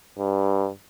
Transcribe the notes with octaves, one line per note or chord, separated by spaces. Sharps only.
G2